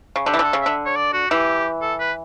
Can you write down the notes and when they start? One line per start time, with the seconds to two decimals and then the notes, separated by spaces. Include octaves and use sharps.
0.16 C#3
0.26 D3 G4
0.34 E3
0.39 D3 A4
0.53 C#3
0.61 D3 E5
0.86 C#5
0.96 D5
1.13 F#4
1.30 E3 G4
1.82 A4
2.00 B4